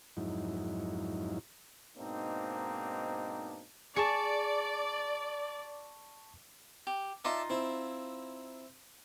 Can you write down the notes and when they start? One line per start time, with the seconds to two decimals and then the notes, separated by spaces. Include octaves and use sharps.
0.17 F2 G#2 F#3 D#4 E4
1.98 G#2 B2 A#3 C4 D4 D#4
3.96 G#4 D5 A5 C#6 C#7
6.87 G4
7.25 D#4 F4 D5 E5 A5
7.50 C4 E4